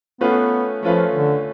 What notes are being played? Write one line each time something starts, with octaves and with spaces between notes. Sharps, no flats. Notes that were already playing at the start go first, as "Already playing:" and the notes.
A3 B3 C#4 F4 B4 F5
F3 A3 C#4 F4 B4 F5
D3